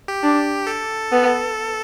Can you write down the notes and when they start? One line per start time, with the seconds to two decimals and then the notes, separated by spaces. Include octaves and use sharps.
0.08 G4
0.23 D4
0.67 A4
1.12 B3